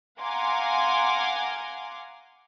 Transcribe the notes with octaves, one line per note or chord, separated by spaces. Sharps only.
F5 F#5 G#5 A#5 C6 D6